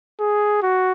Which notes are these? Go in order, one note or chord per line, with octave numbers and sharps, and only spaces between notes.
G#4
F#4